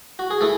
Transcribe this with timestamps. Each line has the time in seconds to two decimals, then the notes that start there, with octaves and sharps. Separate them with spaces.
0.19 F#4
0.31 G#4
0.41 E3 A3 A4